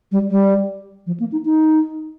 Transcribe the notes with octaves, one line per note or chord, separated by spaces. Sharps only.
G3
G3
F3
A#3
D#4
D#4